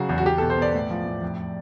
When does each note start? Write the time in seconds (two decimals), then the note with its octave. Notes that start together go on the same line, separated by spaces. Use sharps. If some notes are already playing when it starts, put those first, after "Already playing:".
Already playing: C#3 F#3 F#4
0.09 E2
0.18 F#4
0.25 E2 G4
0.38 B2 A4
0.50 C5
0.58 B3 D5
0.74 A2
0.90 F3
1.06 A2
1.22 F2